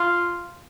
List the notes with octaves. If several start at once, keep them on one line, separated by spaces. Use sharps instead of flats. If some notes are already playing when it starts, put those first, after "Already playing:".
Already playing: F4